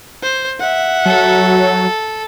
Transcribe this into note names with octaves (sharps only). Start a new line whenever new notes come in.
C5
E5 F#5
F#3 A4